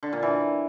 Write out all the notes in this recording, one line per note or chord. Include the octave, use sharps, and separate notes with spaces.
D3
A#2
E3